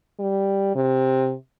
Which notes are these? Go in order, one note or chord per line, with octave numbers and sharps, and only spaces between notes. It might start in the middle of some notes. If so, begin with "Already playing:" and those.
G3
C3